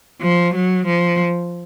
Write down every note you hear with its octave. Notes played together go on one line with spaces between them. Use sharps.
F3
F#3
F3